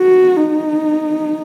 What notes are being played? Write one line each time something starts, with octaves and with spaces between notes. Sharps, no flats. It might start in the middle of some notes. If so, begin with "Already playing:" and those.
Already playing: F#4
D#4